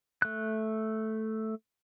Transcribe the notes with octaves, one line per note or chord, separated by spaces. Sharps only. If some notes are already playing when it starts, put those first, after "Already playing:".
A3 F#6